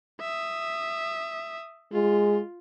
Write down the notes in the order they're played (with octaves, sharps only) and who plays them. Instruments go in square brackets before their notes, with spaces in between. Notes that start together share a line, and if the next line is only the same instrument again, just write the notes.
[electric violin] E5 D#6
[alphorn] G#3 [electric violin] F4